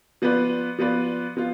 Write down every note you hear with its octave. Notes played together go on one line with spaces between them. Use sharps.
F3 B3 F4 B4 D5
F3 B3 F4 B4 D5
F3 B3 F4